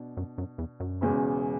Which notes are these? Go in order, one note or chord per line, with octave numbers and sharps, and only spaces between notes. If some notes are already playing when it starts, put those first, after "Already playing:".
Already playing: B2 D4
F#2
F#2
E2
F#2
E1 E2 C#3 G#3